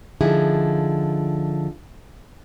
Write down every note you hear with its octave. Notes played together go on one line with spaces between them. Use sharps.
D3 F3 D#4 E4 G#4